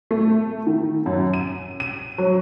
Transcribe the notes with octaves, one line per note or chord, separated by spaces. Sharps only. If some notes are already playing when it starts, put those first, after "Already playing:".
A3
D#3
F#2
D#7
D#7
F#3